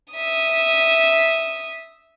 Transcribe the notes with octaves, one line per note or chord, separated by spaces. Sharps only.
E5 D#6